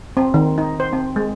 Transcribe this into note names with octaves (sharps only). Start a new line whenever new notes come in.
C4
D#3
D#4
C5
C4
G#3